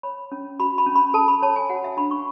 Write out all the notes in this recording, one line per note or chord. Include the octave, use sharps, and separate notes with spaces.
C#5 B5
C#4
F#4 B5
B5
C#4
B5
A4 A5
B5
C#5 A5
G#5
F#4 F#5
E5
D4 B5
C#6